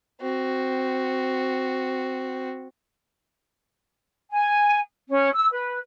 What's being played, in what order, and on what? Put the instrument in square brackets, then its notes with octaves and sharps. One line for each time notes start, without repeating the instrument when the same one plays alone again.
[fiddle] C4 F#4
[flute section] G#5
C#4
E6
B4